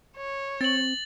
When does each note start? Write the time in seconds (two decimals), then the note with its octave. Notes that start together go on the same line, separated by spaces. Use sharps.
0.17 C#5
0.61 C4 A6 F#7